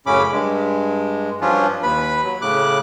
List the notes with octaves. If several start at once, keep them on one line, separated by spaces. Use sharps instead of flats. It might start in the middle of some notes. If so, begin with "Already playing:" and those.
F#2 A2 C#3 C#4 B5 D6
G2 G#3
G2 F3 F#3 C#4 D4 F4
D#2 B4 B5
F#3
A2 C#3 D6 F#6